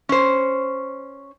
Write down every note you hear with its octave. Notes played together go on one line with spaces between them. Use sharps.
C#4 C5